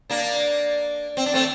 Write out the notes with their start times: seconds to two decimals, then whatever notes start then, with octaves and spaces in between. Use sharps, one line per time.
0.10 A#3 D4
1.17 C4
1.26 D4
1.34 A3 C4